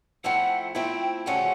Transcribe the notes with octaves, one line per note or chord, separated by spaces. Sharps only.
F3 A3 C4 E4 F#5
F3 A3 C4 E4 G5
D2 C#3 F3 A3 C#4 F#5